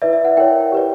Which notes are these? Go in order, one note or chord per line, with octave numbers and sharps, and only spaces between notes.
E4 B4 D5 E5
E5
F#5
E4 A#4 C#5 G5
G4 B4 D5